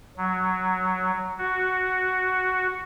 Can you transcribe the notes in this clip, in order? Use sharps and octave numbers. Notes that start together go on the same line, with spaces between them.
F#3
F#4